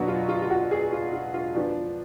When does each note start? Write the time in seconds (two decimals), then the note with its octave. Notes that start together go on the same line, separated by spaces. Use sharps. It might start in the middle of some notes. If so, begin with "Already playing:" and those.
Already playing: B2 F#3 B3 D4 F#4
0.08 F4
0.29 F4
0.42 F4
0.50 F#4
0.71 G#4
0.92 F4
1.13 F4
1.34 F4
1.54 F3 B3 D4